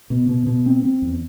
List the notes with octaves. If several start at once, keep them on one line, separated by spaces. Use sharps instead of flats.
B2
B2
B2
C4
C4
E2